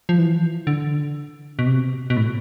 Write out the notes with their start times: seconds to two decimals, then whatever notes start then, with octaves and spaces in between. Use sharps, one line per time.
0.09 F3
0.19 E3
0.67 D3
1.59 B2
1.66 C3
2.10 B2
2.17 A2